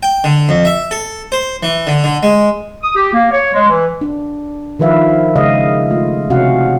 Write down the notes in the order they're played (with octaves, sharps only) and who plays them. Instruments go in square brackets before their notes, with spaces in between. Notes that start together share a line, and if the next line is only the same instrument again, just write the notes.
[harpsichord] G5
D3
F2
E5
A4
C5
E3
D3
D3
G#3
[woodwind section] D#6
G4
A#3
C#5
G#3
E3
[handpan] D4
D#3 F3 B4 E5 F5
C#3 G#3 D#5 F5
A3 F4
C3 C#4 F#4 F5 F#5